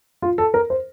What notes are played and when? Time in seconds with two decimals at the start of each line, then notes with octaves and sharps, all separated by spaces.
0.22 F4
0.38 A4
0.54 A#4
0.70 C5